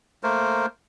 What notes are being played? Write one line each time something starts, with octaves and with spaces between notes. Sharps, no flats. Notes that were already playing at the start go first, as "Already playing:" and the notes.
A3 A#3 A#4 C5